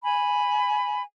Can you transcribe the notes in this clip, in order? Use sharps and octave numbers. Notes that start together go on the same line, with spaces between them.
G#5 B5